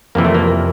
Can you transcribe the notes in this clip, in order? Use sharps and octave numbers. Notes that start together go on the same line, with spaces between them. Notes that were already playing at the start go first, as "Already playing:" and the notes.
F2 C3 E3 A#3
A3
A#3